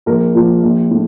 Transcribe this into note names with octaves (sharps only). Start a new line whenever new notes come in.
A#1 A#4
A#2 F3
A#1
A2